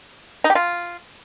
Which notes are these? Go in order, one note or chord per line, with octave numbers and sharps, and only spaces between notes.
D#4
G4
F4